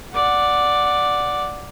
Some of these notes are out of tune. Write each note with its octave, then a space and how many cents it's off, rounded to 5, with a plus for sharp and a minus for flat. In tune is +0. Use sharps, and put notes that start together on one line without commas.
D5 +0 F#5 -5